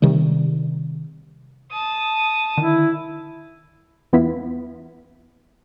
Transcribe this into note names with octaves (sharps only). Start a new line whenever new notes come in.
C3 D#3 G3
A5 D#6
D3 D#3 E4
E2 E3 B3 E4 F4 B6